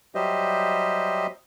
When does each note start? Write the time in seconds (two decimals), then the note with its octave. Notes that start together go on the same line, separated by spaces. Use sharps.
0.15 F#3 G3 G4 C5 D#5 E5